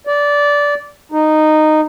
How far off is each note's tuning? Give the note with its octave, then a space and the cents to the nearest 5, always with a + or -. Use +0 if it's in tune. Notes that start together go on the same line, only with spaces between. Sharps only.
D5 -15
D#4 -10